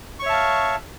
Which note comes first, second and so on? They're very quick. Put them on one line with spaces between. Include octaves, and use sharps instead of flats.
C#6 C#5 E5 A5 F5